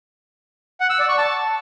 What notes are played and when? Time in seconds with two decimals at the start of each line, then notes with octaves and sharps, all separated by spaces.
0.80 F#5
0.90 E6
0.99 D5
1.09 C#6
1.18 A5